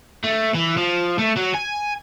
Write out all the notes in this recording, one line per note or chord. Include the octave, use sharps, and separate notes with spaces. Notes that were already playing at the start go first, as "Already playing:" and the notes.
A3
E3
F3
A3
F#3
G#5